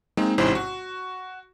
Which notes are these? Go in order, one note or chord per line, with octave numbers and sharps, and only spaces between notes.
G#3 A#3 C4 D#4
A1 G#2 C3 C#4 E4 C5
F#4